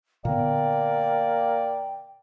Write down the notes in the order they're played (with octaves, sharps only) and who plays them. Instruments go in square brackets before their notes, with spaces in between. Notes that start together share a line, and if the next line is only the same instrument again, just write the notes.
[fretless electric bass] A#2 D3 B3 [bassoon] A#3 [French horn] D5 [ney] G5